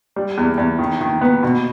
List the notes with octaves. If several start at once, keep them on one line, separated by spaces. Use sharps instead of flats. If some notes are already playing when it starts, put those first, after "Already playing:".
G3
E2
E2
D#3
D#3
B3
B2